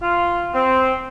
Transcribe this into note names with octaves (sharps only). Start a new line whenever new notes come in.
F4
C4